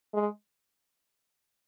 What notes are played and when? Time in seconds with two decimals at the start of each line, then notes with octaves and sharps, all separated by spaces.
0.14 G#3